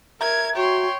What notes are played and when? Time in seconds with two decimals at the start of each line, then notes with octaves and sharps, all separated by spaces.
0.21 A#4 E5 A#5 G#6
0.56 F#4 C#5 G5 C6